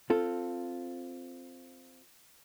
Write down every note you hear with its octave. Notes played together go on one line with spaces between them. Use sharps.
C4 F4 A4